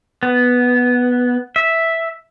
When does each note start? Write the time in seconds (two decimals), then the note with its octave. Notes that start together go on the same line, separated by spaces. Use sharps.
0.23 B3
1.56 E5